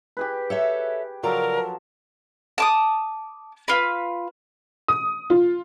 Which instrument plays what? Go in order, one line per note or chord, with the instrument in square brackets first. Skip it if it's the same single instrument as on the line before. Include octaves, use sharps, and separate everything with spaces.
[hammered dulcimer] G4 G#4 B4
[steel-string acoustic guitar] A4 C#5 E5
[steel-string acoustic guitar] C#3 D5 A#5 [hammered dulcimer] F3 F#3 A4 [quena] A#4
[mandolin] A5 D6 D#6
F4 B4
[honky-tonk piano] D#6
F4